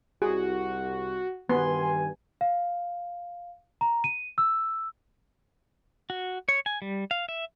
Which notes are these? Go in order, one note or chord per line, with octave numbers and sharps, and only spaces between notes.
C2 F#4 G#4
G2 D#3 B3 G#5 C6
F5
A#5
D#7
E6
F#4
C#5
G#5
G3
F5
E5